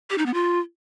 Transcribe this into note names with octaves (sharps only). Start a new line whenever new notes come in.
G4
D#4
B3
F4